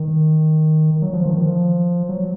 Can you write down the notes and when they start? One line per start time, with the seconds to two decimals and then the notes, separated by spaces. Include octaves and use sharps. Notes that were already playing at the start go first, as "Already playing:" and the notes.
Already playing: D#3
1.02 F#3
1.13 F3
1.26 D#3
1.38 F3
2.09 F#3